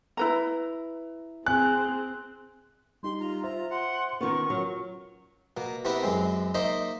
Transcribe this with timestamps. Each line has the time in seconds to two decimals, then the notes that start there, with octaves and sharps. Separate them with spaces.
0.17 E4 B4 A#5
1.46 C4 G#4 G#5 F#6
3.03 G3 D#4 G4 C6
3.20 F4 A#5
3.44 C5 E5 A#5
3.70 F#5 C6
4.21 D#3 B3 C#4 F4 A#4 C#6
4.50 F#3
5.57 B2 A#3
5.85 B3 C4 E4 G4 A#4 B4
6.03 F#2 G#3 C4
6.54 A#3 D#4 C5 D#5 E5